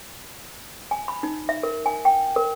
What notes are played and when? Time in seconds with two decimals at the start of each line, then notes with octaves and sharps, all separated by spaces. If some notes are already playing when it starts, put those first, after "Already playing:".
0.91 G#5
1.08 B5
1.23 D#4
1.49 E5
1.63 A#4
1.86 G#5
2.05 G5
2.36 A#4